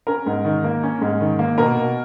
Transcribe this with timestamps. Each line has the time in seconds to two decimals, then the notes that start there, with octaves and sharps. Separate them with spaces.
0.07 C#4 A#4
0.26 G#2
0.45 D#3
0.64 A#3
0.83 C#4
1.01 G#2
1.21 D#3
1.39 A#3
1.58 B2 A#4
1.78 B2